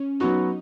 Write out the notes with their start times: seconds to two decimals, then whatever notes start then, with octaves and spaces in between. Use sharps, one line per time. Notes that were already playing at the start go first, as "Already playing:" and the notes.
Already playing: C#4
0.20 F#3 B3 D#4 F#4